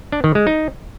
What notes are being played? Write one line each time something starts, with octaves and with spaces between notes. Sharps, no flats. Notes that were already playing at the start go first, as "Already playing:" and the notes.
D4
D#3
G#3
D#4